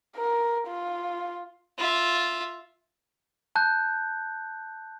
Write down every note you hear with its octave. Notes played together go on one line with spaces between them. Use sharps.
A#4
F4
F4 E5
A5 F#6 G6